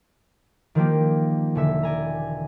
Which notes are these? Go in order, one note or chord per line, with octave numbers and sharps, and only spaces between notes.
D#3 F3 A#3 G4
E1 D3 E5
D5 G#5 A#5